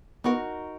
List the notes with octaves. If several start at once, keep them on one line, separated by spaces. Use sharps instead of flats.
B3 D#4 F#4 A#4